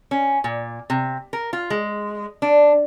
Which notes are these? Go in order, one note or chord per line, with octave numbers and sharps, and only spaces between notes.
C#4
A#2
C3
A#4
F4
G#3
D4